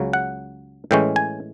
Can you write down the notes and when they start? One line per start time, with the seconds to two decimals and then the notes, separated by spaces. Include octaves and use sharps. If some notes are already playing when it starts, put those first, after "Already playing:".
Already playing: C#2 C#3 F#3
0.13 F#5
0.91 A2 E3 G#3 C#4 G5
1.16 G#5